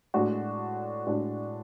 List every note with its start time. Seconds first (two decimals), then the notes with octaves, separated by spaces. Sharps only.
0.14 A2 G#3 D4 F#4
1.06 A2 G#3 D4 F#4